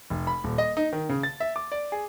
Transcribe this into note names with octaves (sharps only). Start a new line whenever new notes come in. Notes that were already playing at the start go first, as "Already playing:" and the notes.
F1
B5
D#1
D#5
D#4
D#3
C#3
A6
E5
D6
D5
G#4